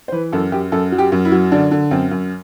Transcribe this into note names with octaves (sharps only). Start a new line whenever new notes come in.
C5
E3 B4
F#2 A4
F#2 G4
F#2 A4
F#3
G4
F#2
E4
F#3
D3 D4
D3
F#2 C4
F#2